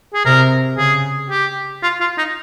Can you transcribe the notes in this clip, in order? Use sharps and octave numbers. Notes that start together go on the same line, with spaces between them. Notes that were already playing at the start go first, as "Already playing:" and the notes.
G#4
C3 A#4
C#3 G#4
G4
F4
F4
D#4